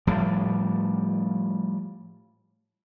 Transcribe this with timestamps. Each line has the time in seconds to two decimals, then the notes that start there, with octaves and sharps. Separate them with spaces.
0.07 A2 F3 G3